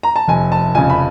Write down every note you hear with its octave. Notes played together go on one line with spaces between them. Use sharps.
A#5
A5
F1 G#5
A5
F2 C#3 G#5
B5